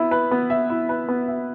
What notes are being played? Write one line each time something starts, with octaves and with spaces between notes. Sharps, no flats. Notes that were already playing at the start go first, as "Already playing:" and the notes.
Already playing: B3 E4
B4
B3
E5
E4
B4
B3
E5